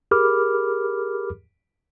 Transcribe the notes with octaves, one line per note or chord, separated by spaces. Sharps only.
G4 G#4 A#4 B5 D6 F6